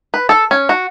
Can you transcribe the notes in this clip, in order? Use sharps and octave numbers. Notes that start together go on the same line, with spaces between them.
B4
A4
C#4
F#4